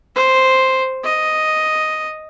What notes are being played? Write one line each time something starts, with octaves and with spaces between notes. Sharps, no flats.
C5
D#5